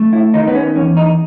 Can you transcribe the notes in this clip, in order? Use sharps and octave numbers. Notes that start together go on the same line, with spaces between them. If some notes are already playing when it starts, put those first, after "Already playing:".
Already playing: A3
E4
D#3 D#4
B3
C#4
E2 C#4
D#4